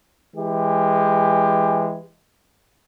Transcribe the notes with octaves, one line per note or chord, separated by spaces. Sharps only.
E3 G#3 G4